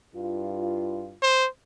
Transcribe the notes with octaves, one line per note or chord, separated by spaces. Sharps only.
G2 E4 F4
C5